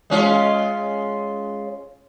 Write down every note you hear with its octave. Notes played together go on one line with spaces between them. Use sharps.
G#3 C#4 F4